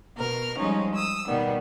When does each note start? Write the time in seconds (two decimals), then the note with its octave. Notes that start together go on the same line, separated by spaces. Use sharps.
0.17 B2 A#4 F6
0.58 F3 G3 G#3 C#4 D#4
0.95 D#6 E6
1.28 B2 D#3 G3 B3